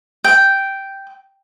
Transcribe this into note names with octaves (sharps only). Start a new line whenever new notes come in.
G5